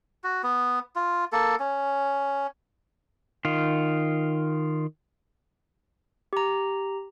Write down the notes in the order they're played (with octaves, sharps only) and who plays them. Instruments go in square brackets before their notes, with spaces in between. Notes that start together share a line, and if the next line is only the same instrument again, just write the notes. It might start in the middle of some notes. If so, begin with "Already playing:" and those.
[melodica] F#4
B3
F4
A#3 A4
C#4
[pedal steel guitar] D#3 F4
[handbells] G4 A#5